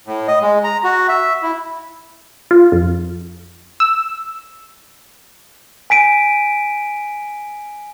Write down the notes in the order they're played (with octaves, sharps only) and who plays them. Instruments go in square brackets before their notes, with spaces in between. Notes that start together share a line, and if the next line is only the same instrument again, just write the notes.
[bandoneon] A2
D#5
G#3
A#5
F#4
E5
E4
[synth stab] F4
F2
E6
[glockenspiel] G#5 B6 D7 D#7